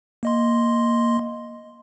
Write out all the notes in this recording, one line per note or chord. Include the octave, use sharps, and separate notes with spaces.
A#3 D#5 C6